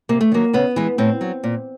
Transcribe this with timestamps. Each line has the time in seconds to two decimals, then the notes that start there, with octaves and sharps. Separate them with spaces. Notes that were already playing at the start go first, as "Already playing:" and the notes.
0.09 C3 A#3
0.21 A3
0.32 D#3 F#3 A#3
0.53 C#3 B3
0.76 E3 G#3
0.98 A2 C4
1.21 F#3
1.44 A#2